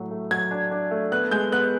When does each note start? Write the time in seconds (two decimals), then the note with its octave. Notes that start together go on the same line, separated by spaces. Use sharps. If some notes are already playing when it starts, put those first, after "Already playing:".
Already playing: A2 F#3 A3
0.11 A3
0.31 F#3 G#6
0.51 D4
0.71 D4
0.91 A3
1.12 B3 F#6
1.31 G#3 G6
1.52 B3 F#6